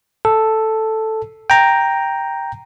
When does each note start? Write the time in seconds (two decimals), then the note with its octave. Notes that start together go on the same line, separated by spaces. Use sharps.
0.25 A4
1.50 G5 A#5